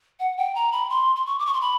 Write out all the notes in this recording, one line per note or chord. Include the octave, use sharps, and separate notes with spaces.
F#5
G5
A#5
B5
C6
C6
C#6
D6
C#6
C6
B5